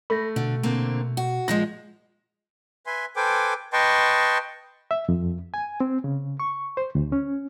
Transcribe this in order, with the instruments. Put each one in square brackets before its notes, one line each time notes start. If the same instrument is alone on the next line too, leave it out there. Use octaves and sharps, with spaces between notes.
[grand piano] A3 [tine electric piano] B5 A#6
[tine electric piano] B2 [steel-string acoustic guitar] D3
[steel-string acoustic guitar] D3 A#3 C4
F#4
[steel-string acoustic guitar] A#2 F3 G#3 [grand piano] A#6
[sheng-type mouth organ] B4 E5 G#5 C6
A4 B4 C5 G5 G#5 D6
B4 D#5 G5 A5 C6 C#6
[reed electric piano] E5
F2
G#5
C4
C#3
C#6
C5
D2
C#4